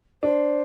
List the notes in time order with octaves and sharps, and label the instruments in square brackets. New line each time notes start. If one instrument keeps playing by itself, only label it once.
[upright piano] D4 [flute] C5